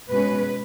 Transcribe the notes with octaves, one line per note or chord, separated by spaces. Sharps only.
B2 G#3 C#4 B4